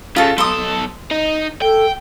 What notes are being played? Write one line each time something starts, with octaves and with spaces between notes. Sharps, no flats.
C#3 F4 A4
B1 A4 C6 D#6
D#4
A4 G5